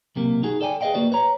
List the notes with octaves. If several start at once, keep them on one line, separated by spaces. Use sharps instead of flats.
B1 C3 A#3
D#4 F#4 G#4
A4 D5 G5 G#5
G#4 B4 D5 D#5 F5 G5
A#3 F#4 B4 D5
B4 C#5 A#5